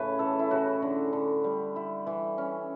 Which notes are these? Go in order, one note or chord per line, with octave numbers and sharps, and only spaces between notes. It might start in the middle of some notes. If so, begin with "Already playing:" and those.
Already playing: A2 C#3 B4 C#5
E3 A4
E4
C#3 F#4
D3
D3
G3
E4
E3
C#4